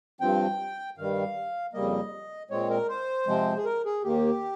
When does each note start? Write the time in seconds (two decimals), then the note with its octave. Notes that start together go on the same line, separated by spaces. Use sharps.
0.21 G2 F3 C4 G5
0.97 G2 D#3 G3 F5
1.73 F2 C#3 G3 A#3 D#5
2.50 A#2 G#3 C4 C#5
2.70 A#4
2.88 C5
3.27 C3 F3 G#3 C4
3.57 G#4
3.65 A#4
3.85 G#4
4.04 D#2 D#3 A#3 G4